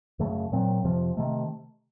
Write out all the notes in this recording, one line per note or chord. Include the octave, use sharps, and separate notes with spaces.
F#2 C#3 A3
A#2 F#3 C4
F2 C3 F3
C3 D#3 A3